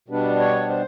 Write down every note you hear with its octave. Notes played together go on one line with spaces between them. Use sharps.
B2 G3 B3 D4
C#5
C5